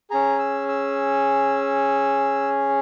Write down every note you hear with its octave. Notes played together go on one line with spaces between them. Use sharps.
C#4 G#4 A#5
E6
E6